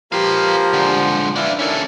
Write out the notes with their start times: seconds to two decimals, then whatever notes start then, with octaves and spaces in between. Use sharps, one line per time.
0.12 F3 A#3 G4 B4 F5
0.73 D3 G#3
1.36 B3 D4 E4 F4
1.59 D#3 C#4 D4 E4 A4